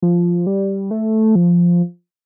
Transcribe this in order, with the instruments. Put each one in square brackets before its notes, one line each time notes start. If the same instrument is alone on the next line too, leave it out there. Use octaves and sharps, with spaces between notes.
[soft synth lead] F3
G3
A3
F3